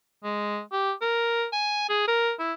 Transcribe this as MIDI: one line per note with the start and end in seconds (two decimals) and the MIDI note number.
0.24 0.60 56
0.72 0.92 67
1.02 1.46 70
1.53 1.89 80
1.89 2.03 68
2.08 2.32 70
2.39 2.53 64